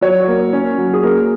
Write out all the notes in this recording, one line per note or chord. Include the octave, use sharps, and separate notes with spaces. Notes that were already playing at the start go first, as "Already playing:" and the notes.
F#3 C#5
A#3
C#4
F#3
G#4
A#3 A#4